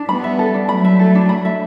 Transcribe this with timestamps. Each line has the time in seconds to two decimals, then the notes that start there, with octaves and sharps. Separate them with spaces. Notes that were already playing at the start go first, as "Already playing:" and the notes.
Already playing: D4
0.09 G3 B3 B5
0.24 E5
0.39 A4
0.54 D4
0.69 F#3 A3 B5
0.85 E5
0.99 A4
1.15 D4
1.29 B5
1.45 E5